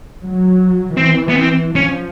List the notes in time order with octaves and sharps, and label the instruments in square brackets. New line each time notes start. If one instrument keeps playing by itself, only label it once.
[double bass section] F#3
[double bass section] E3 [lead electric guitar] C4
[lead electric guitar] B3
C4
[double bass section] F3 [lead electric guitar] C#4